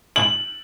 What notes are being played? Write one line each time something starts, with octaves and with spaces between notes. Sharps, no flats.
F#7